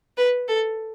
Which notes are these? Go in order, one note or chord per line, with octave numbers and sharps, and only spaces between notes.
B4
A4